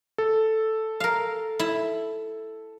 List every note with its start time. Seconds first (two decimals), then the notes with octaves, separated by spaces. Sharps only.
0.18 A4
1.00 A#4 F5
1.59 E4